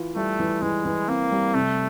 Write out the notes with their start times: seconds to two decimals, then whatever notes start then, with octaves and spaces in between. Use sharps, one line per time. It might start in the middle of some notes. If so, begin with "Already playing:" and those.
Already playing: E3 F4
0.16 G3 A3
0.39 E3
0.62 E3 G#3
0.85 E3
1.08 A#3 C4
1.31 G3
1.54 C3 A3